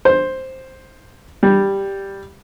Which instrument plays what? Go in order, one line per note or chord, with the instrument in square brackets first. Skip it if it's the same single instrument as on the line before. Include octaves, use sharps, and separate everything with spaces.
[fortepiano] C5
G3